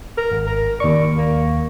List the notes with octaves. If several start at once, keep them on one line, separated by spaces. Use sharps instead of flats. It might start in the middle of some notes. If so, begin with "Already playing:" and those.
A#4
G#1
A#4
D#2 D5 C#6
A#3